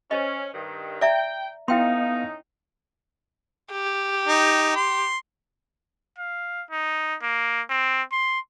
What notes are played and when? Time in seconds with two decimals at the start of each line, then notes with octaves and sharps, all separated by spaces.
0.11 C#4 C5 D#5
0.53 G2 D#3
1.01 D5 E5 G5 A#5
1.68 A2 B3 C#4 D#4 E4 F5 G5 C6
3.72 G4
4.28 D#4
4.76 C6
6.18 F5
6.71 D#4
7.22 A#3
7.69 C4
8.12 C6